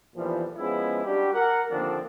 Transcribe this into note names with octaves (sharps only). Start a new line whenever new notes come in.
B1 A#2 E3 F3 G3
F3 G#3 B3 C#4 E4
G3 D4 F#4 G4
A#4 F#5
D#2 D3 F3 A#3 C4 D4